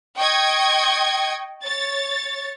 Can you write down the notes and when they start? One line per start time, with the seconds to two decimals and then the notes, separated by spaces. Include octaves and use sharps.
0.18 D#5 G5 C#6 G#6
1.64 C#5 A6